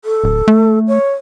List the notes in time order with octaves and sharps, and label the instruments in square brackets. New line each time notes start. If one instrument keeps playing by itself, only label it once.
[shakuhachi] A4
[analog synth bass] D1
A3
[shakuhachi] C#5